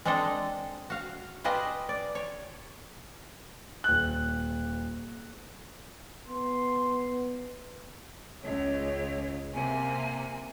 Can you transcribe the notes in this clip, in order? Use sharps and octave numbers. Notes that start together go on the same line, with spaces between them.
G#3 C4 D4 A4 D#5
F#4 F5
F4 G4 G#4 B4 D#5
D5
C#5
D#1 F#6
B3 C6
C#2 C#5
C3 A#3 G#5